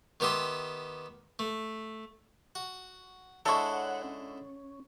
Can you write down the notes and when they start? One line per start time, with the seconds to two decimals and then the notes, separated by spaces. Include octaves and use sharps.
0.20 D#3 B3 G4 E5 C6
1.39 A3
2.55 F#4
3.46 D3 G#3 E4 A4 C#5 F#5 C#6
4.04 C#4